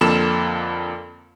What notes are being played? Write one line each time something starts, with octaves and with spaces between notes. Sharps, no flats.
F2 D3 A#3 F4 A4 E7